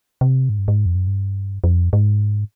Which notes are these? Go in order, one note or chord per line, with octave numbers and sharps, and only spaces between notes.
C3
G#2
G2
G#2
F2
F#2
G2
F2
G#2